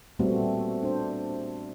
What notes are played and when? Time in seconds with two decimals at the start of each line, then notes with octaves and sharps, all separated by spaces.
0.19 A#2 G3 A3 B3 C4 F#4
0.83 D4 C5